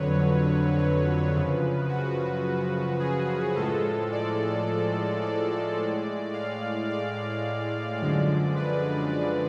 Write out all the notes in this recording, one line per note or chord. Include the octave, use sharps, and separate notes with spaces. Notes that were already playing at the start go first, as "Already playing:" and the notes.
Already playing: F2 D3 F#3 B4 C#5
B4
F#2 C#3 F3
F#4
G#4
A2 F3 G#3 A4
D5
D5
A2 G#3
F5
D5
F#2 D3 F3 G#3 D5
B4
D5